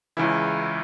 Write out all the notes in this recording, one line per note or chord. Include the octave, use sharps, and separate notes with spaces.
C#2 C#3 E3 E4